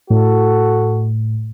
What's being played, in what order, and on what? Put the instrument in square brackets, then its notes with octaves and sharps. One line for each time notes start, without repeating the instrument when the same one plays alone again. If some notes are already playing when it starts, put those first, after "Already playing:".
[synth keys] A2 [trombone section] F#4 A4